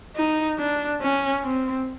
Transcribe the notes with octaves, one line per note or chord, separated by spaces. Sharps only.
D#4
D4
C#4
C4